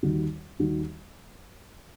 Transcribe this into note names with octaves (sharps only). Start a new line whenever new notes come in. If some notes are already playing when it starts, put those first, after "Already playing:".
D#2 D#3 G3 D#4 F#4
D#2 D#3 G3 D#4 F#4